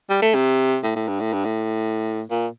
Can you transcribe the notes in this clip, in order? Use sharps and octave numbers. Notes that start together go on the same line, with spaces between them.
G3
A3
C3
A2
A2
G2
A2
G2
A2
A#2